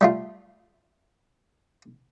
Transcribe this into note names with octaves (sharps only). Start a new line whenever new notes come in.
G3 A3 F4